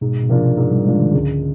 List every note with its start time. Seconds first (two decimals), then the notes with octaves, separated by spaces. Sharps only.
0.01 G#2 B2
0.23 B2
0.29 C3 F3 A#3 D4 F4
0.57 G#2
0.71 G3
0.86 F3 G#3 A#3 D4 F4
0.99 D#3
1.13 C#2 D3